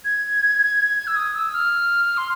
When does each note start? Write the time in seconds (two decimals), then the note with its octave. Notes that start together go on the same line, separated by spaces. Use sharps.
0.05 G#6
1.07 E6
1.16 D#6
1.35 E6
1.53 F6
2.17 C6